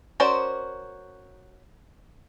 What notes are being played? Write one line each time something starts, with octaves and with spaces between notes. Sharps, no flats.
C#4 F#4 A#4 C5 D5